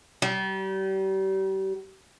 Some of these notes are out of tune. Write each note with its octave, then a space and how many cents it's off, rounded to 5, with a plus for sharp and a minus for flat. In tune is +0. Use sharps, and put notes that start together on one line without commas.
G3 -35